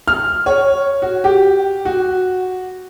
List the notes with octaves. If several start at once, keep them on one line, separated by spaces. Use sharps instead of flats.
F6
C#5
F#4
G4
F#4